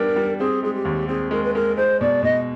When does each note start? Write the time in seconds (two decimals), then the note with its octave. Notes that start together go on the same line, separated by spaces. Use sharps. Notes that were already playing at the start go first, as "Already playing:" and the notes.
Already playing: G3 B3 D4 A#4
0.16 G3
0.39 C4 G#4
0.63 G#3 G#4
0.74 G4
0.85 D#2
1.08 C4 G#4
1.31 G#3 A#4
1.44 B4
1.54 G#3 A#4
1.77 G#3 C5
2.01 B2 D5
2.23 B2 D#5